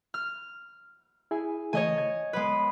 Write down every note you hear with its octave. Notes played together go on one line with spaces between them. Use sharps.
F6
E4 G#4 G#5
C#3 E3 A3 C#5 D#5 G#5
G#6
G#3 B3 B4